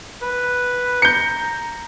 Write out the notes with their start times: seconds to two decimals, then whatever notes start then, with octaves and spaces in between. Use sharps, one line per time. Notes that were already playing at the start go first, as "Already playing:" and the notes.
0.22 B4
1.02 A#5 G6 C#7